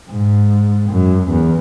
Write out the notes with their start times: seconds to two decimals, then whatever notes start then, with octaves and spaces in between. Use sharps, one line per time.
0.10 G#2
0.91 F#2
1.31 E2